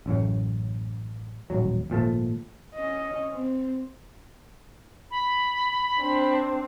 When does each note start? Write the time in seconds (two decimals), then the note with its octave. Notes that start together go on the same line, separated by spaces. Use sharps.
0.06 A1 F#2 A2 C#3
1.50 D#1 A1 F#3
1.90 G#1 A#2 F3 A3
2.74 C#4 D#5
3.32 C4
5.10 B5
5.99 C4 D4